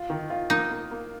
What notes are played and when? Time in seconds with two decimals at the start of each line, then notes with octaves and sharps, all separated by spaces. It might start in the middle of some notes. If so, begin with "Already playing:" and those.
Already playing: F4
0.10 D#3
0.30 F4
0.50 A#3 D#4
0.70 A#3
0.91 A#3